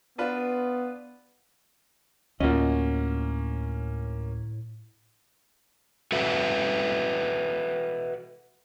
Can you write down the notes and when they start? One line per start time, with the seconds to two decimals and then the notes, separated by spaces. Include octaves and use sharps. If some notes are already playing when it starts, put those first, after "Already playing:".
0.18 B3 D4 F4 B4
2.40 D2 A2 A#3 C#4 F4 F#4 D#5
6.12 F#4 A4 B4 E5